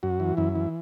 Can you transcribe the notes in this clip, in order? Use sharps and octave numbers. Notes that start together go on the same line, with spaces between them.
F#2 F#4
E3
F#2 E4
E3